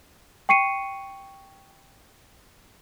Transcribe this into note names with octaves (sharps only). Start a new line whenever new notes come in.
G5 C#6 C7 C#7 D#7